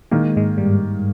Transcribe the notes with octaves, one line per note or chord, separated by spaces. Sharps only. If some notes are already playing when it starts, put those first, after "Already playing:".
D#3 G#3 A#3 D#4 A#4
G#2 G#3
G2 G3